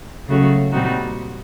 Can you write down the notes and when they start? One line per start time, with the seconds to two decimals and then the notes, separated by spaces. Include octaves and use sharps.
0.28 C#3 F#3 A3 C#4 F#4
0.72 A#2 G3 C4 D#4 F#4